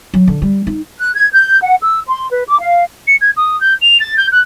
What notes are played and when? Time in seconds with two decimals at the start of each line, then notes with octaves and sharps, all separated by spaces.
0.14 F#3
0.27 D3
0.42 G3
0.67 D#4
0.99 F#6
1.14 G#6
1.33 G6
1.63 F#5
1.82 E6
2.08 C6
2.32 B4
2.48 D6
2.60 F5
3.07 C#7
3.21 G#6
3.37 D#6
3.61 G6
3.81 F7
4.00 A6
4.17 G6
4.32 F#6